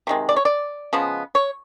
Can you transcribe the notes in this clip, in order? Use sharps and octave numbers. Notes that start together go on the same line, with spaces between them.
C3 D#3 G#3
D5
C#5
D5
C#3 F3 G#3 B3
C#5